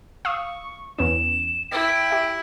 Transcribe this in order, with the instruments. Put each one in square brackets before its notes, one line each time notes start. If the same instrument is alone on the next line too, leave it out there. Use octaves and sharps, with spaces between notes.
[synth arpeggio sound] F5 D#6 E6 [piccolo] C#6
[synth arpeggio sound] E2 B3 C#4 [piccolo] E7
[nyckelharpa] E4 [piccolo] G5 [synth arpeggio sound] A6
[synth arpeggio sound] G4 E5